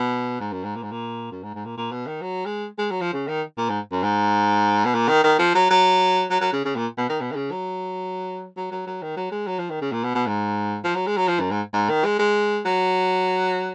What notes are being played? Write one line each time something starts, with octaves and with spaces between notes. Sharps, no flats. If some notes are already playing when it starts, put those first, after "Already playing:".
Already playing: B2
G#2
F#2
G#2
A#2
G#2
A#2
F#2
G#2
G#2
A#2
A#2
B2
D#3
F#3
G#3
G#3
F#3
F3
C#3
D#3
A#2
G#2
F#2
G#2
B2
A#2
D#3
D#3
F3
F#3
F#3
F#3
F#3
C#3
C#3
A#2
B2
D#3
B2
D#3
C#3
F#3
F#3
F#3
F#3
D#3
F#3
G#3
F#3
F3
D#3
C#3
A#2
B2
B2
G#2
F3
F#3
G#3
F#3
F3
F#2
G#2
G#2
D#3
G#3
G#3
F#3